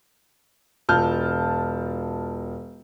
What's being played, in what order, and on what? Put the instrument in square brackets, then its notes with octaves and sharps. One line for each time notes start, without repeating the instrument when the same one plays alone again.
[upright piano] E1 F4 A5 F6 G6